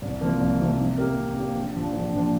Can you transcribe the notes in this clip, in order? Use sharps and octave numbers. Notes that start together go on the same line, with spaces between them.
C2
C3 F3 A#3
C2
C3 F3 A#3
C3
A#3 G4 A#4
C3
A#3 G4 A#4
A#1
A#2 F3 D4
A#1
A#2 F3 D4